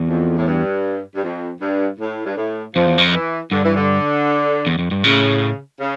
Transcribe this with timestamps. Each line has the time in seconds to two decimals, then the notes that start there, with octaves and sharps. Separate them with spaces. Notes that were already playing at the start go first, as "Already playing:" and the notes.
Already playing: E2
0.08 F2
0.37 A2
0.47 G2
1.15 G2
1.23 F2
1.61 G2
1.99 A2
2.25 G2
2.37 A2
2.75 F2 F3
2.86 E2
2.98 F2
3.14 E3
3.51 G2 D3
3.64 E3
3.76 D3
4.67 E2
4.79 F2
4.91 G2
5.04 A2 C#3
5.80 C#3